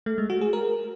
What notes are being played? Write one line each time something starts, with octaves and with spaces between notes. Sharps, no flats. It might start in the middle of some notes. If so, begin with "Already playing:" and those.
A3
G#3
F#4
G#4
A#4